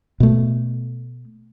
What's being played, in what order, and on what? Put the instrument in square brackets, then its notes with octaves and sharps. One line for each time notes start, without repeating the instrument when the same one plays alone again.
[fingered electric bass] B2 A3